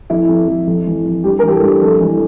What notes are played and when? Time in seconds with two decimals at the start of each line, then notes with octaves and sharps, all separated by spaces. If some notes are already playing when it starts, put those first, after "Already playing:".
0.10 F2 E4
0.28 F2
0.47 F2
0.67 F2
0.87 E3
1.05 F2
1.24 G2 G4
1.39 A#4
1.43 E3 G4
1.53 A4
1.63 G2 G4
1.81 F2 A4
2.00 E3